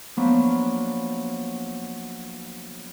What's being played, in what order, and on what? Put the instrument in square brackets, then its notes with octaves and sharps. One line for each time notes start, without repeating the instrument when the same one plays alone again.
[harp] F3 F#3 A#3 B3 D4